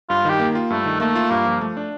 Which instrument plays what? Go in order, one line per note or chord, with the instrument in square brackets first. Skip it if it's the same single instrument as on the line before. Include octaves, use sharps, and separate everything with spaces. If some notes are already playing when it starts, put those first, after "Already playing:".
[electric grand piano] G2 [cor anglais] F4
[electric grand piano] D#3 [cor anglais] G4
[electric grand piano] A#3
F4
[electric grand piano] G2 [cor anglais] A3
[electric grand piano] D#3
[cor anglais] A3 [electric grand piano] A#3
[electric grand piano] F4
[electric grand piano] G2 [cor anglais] A#3
[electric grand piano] F3
A3
D4